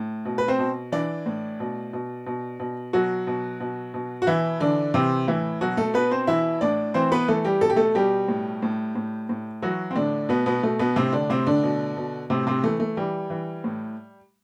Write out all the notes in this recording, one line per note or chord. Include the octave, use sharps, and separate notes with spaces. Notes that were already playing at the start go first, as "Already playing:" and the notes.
Already playing: A2
B2
B4
C4 C5
B2
E3 D4 D5
A2
B2
B2
B2
B2
B2 F#3 F#4
B2
B2
B2
F#4
E3 E4
D3 E3 D4
C3 E3 C4
A2 E3 E4
B2 F#3 F#4
A3 A4
B2 B3 B4
C4 C5
E3 E4 E5
A2 D4 D5
E3 C4 C5
B3 B4
E3 A3 A4
G3 G4
B2 A4
G4
A3 A4
B2 G3 G4
A2
A2
A2
A2
E3 F#3 F#4
C4
A2 D3 D4
B2 B3
B2 B3
B2 A3
B2 B3
A2 C3 C4
D3 D4
A2 C3 C4
D3 D4
B2
B2
A2 C3 C4
C3 C4
E3 A3
A3
E3 G3
E3
A2